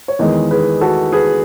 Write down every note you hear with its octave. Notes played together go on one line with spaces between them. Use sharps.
C#5
E2 D#3 G#3 B4 D#5
G#4 B4
F#4 A4
G#4 B4